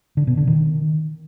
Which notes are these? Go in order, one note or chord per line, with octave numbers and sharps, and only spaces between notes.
D3
B2
D3
D#3